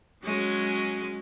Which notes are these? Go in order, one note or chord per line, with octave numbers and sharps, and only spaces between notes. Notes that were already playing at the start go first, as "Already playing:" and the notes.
F#3 G#3 C#4